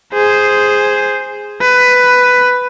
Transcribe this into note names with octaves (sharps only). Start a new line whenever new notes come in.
G#4 C5
B4